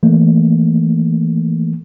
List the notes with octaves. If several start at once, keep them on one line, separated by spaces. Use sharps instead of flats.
E3 A3 A#3